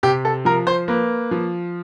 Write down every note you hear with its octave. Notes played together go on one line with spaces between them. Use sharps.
C3 G4
A4
F3 A#4
C5
A#3 B4
F3